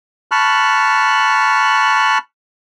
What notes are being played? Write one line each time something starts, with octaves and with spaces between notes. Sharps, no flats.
A5 B5 C#6 F6 F#6